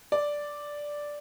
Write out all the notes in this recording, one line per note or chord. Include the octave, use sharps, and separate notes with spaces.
D5